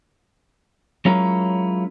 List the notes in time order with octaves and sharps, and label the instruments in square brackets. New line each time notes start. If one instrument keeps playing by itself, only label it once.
[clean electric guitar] F#3 G#3 C#4 E4 F4 A#4